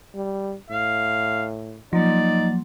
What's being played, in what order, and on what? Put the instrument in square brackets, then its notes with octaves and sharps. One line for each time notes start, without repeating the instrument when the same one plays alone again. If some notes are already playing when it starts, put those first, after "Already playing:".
[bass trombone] G3
[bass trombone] A2 [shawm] F5
[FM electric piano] F3 [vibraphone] F#3 A#3 [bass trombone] D#4 [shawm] D5